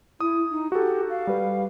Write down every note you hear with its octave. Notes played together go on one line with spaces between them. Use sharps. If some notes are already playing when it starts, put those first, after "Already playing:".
E4 D#6
D#4
F#4 G4 A4
F5
G3 B4